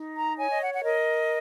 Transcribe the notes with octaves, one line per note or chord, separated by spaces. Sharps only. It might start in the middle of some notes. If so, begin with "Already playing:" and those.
Already playing: D#4
A#5
C#5 G#5
D#5
F#5
F#5
A#4 D#5